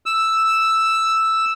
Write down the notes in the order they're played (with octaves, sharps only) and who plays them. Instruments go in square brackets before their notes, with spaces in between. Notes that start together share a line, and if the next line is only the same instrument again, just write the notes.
[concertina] E6